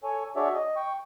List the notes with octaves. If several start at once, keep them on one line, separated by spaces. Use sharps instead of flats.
A4 C#5 G#5
D4 F#4 G#4 C#5 D5 E5
D#5
G5 C#6